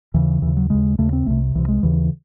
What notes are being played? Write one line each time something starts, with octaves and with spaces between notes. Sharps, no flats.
D#2 C#3 E3
D#2 C#3 E3
F#3
D#2 C#3 G#3
D#2 C#3 A3
C4
C2 C3 A3
C2 C3 E3
G#3
D#2 C#3 E3